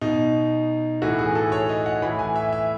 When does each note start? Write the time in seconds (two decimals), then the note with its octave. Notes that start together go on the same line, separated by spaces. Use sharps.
0.01 B2 D#4
1.02 A2 E3 F#4
1.19 G#4
1.35 A4
1.52 C#5
1.69 D#5
1.86 F#5
2.02 A2 E3 B5
2.19 G#5
2.36 E5
2.52 E5